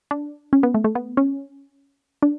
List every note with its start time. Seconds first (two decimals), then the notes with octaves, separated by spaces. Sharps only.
0.11 D4
0.53 C#4
0.63 B3
0.74 A3
0.84 A3
0.95 B3
1.17 C#4
2.22 D4